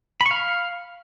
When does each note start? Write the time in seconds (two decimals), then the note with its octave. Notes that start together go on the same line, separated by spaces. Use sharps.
0.21 B5
0.26 C#6
0.31 F5